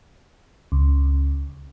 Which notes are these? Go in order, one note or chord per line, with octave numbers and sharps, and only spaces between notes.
C#2